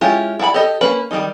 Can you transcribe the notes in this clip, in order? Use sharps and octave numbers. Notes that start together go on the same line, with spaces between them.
G#3 C#4 E4 F4 G4
E4 D5 F#5 A5 B5
G4 A4 D#5
A#3 C#4 B4 B5
D#3 F#3 G3 D#4